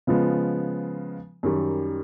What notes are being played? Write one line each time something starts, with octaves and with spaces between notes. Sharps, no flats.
C#3 F3 G#3 B3
F#2 D#3 G3